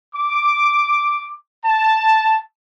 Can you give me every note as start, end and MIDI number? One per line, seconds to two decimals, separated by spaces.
0.15 1.34 86
1.64 2.41 81